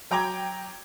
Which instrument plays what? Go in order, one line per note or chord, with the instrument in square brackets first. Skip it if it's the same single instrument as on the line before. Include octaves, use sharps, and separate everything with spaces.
[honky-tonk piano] F#3 G5 A#5 D6 G#6